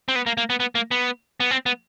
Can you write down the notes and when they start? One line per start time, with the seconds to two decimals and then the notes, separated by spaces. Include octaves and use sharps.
0.08 C4
0.15 B3
0.26 A#3
0.37 A#3
0.50 B3
0.60 B3
0.75 A#3
0.91 B3
1.40 B3
1.51 C4
1.66 B3